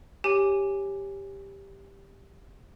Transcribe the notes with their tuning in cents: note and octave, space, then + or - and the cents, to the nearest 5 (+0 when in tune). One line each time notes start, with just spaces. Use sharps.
G4 +5 C#5 +0 G#5 -5